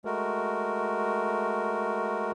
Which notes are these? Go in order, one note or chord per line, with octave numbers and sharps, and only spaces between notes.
G#3 A3 F#4 A#4